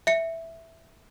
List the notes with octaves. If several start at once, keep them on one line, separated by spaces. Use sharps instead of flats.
E5 C#7